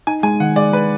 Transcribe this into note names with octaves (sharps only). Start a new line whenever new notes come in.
D#4 G#5
G#3 G#5
D#3 F#5
G#3 D5
G#3 B4